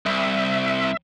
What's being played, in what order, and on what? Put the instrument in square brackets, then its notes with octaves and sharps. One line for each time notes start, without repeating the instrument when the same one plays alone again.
[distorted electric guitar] C2 [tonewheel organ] E5